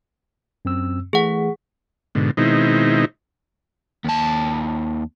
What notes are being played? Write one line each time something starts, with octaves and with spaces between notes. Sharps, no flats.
F#2 C4 E6
E3 A3 G#4 F#5
G#2 B2 D3
B2 D#3 G#3 C4 D#4 E4
D#2 A5